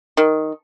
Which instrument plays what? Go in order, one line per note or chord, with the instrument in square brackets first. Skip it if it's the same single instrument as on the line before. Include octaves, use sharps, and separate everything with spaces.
[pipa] D#3